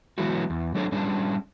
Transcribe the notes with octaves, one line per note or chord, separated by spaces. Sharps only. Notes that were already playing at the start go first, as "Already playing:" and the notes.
E3 F#3 G#3 B3 E4 F#4
E2
F#3 A3 D4 G#4 B4 C#5
G3 C#4 D4 G#4